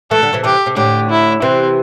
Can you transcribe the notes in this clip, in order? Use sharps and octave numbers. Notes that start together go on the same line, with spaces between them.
E3 A3 A4
D3 G3
C3 E3
C3 E3 G4
C3
A2 D3 G4
E4
C3 E3 C4